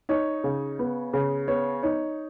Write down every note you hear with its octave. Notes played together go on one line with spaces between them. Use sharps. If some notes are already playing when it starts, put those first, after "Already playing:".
D#4 C#5
C#3
B3
C#3
B3 C#5
D#4 C#5